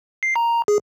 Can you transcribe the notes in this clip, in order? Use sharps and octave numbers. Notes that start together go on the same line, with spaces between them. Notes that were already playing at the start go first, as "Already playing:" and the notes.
C7
A#5
G#4